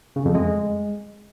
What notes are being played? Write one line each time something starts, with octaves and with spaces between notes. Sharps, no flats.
C#3
F2
G#3